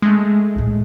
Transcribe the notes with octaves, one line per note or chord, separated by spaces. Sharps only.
G#3 A3
C#2 A2